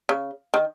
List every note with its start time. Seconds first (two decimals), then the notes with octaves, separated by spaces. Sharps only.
0.09 C#3
0.54 D#3